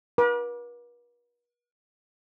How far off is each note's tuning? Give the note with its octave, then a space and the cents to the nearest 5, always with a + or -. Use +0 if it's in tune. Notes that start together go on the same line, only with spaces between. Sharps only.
B4 -45 D6 +5